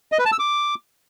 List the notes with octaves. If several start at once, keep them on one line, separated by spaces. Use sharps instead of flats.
D#5
B4
A5
E6
D6